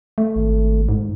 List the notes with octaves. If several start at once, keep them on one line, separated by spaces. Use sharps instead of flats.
A3
G#1
G#2